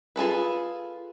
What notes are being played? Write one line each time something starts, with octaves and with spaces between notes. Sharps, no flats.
F4 G#4 A4 B4